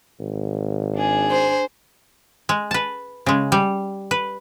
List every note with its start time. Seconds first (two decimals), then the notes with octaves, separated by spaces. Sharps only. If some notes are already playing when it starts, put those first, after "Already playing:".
0.20 G#1
0.95 D4 G#4
1.31 C5
2.49 G#3
2.71 B4 A5
3.26 C#3 G#3
3.52 G3
4.11 B4